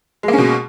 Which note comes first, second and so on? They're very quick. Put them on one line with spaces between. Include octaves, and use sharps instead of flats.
G#3 A#3 C#4 B2